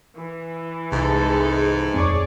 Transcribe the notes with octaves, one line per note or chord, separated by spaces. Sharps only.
E3
C2 G#2 C3 G#3 A4
D#1 F2 C4 G#4 C#5 D5